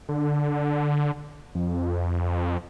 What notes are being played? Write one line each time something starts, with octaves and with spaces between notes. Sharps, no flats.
D3
F2